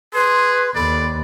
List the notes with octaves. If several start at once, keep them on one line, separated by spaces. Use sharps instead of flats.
G#4 B4 C6
D#2 A4 D5 B5